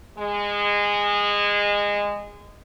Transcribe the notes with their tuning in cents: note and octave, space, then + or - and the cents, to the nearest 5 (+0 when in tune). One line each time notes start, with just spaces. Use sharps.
G#3 -20